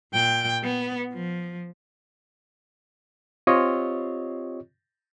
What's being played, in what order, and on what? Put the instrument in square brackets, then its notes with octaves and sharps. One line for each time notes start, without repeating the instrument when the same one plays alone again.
[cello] A#2 G5
B3
F3
[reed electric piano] C4 F4 G4 C#5 D#5